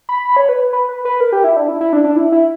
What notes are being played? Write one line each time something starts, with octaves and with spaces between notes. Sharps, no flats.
B5
B5
C#5
B4
B4
B4
B4
A#4
G4
E4
D4
E4
E4
D4
D4
E4
E4